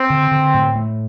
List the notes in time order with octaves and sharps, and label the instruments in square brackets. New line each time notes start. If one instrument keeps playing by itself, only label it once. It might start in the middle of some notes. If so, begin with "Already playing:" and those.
Already playing: [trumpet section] C4
[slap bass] D3
D3
A2
A3